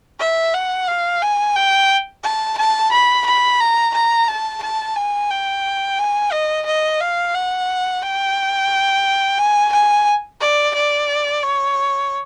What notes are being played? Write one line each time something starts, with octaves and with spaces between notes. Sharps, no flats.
E5
F#5
F5
G#5
G5
A5
A5
B5
B5
A#5
A#5
A5
A5
G#5
G5
G#5
D#5
D#5
F5
F#5
G5
G#5
G#5
D5
D5
C#5